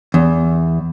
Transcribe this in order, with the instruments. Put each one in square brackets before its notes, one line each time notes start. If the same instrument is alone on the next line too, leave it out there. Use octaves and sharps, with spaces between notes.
[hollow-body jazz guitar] E2